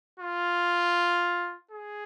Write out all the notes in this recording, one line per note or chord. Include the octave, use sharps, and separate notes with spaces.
F4
G#4